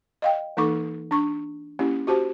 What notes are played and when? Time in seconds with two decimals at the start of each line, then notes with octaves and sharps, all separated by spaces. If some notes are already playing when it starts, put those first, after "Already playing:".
0.22 D#5 F5 G5
0.57 E3 A#3 D#4 A4 C#6 D6
1.11 D4 C#6
1.79 A#3 C#4 E4 G4
2.07 F#4 G4 C5 A5